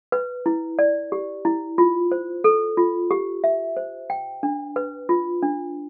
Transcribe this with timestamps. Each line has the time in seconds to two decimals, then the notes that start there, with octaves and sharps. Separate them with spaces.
0.12 B4
0.46 E4
0.79 D5
1.12 G4
1.45 E4
1.78 F4
2.12 C5
2.44 A4
2.77 F4
3.11 G4
3.44 E5
3.77 C5
4.10 G5
4.43 D4
4.76 B4
5.09 F4
5.43 D4